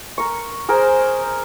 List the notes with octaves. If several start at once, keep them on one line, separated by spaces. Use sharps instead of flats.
A#4 C#6
G#4 A#4 C5